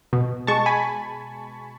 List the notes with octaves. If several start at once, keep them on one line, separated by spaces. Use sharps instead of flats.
B2
G#3 A5 C#6
G#5 B5